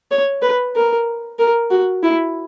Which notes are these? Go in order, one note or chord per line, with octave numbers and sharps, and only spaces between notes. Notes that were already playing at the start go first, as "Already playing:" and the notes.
C#5
B4
A#4
A#4
F#4
E4